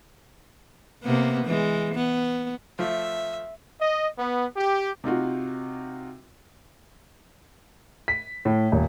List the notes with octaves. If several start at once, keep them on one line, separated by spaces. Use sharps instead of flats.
C3 A#3 B3
E3 G#3
B3
F3 A3 E5
D#5
B3
G4
C3 D#4 F4 F#4
B6
A2
D#1